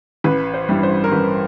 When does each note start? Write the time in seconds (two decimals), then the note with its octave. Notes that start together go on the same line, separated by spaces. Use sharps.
0.24 A1 B4
0.54 C5
0.69 G2 E3 G3
0.83 C5
1.04 A#4
1.12 A1 B4